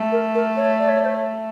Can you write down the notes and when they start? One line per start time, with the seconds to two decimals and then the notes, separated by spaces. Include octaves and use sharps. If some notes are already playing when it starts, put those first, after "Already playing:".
Already playing: A3
0.12 A#4
0.34 A#4
0.57 C#5
0.79 D5
0.88 C#5
0.97 D5
1.05 C5
1.09 C#5